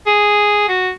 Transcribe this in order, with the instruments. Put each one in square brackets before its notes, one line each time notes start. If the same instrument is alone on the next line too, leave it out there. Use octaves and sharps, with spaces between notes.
[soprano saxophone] G#4
F#4